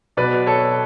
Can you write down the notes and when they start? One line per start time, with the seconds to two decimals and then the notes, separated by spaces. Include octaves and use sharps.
0.17 B2 F#3 B3 B4 D5
0.46 A4 C#5